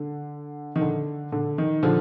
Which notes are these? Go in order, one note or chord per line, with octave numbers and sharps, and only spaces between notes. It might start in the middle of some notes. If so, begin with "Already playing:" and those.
Already playing: D3
D#3
D3
D3
D#3
D3 F3